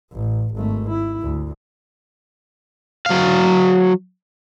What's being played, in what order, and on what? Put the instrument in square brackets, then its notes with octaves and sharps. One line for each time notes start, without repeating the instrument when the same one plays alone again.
[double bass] A1
G#1 A3
E4
D2
[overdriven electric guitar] F#3 F5